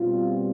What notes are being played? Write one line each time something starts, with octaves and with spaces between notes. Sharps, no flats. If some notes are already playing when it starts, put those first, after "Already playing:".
Already playing: B2 G3 C4 F4